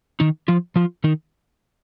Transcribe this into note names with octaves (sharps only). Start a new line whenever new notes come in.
D#3 D#4
F3 F4
F3 F4
D#3 D#4